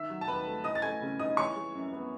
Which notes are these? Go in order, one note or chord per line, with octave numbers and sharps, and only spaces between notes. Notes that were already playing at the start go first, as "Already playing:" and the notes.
Already playing: D#3 E5 E6
F#3
A5
D#2 B4 B5
A3
E3 D#5 D#6
A6
A3 G#5 G#6
C#3
D#4 D#5 D#6
E3 C#5 C#6
G#3
F#2
B3